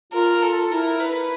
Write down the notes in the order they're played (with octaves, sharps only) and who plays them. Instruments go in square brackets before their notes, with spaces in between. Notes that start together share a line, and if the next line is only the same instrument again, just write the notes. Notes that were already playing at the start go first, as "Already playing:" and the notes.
[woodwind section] F4 [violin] A#4
[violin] A4
[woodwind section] E4 [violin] A#4
[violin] B4